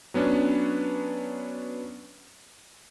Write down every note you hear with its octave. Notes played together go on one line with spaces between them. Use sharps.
F#3 B3 C#4 D4